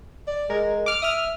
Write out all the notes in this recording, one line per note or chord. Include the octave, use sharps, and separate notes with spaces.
D5
G#3 A#4
D6 F6
E5 D#6 F6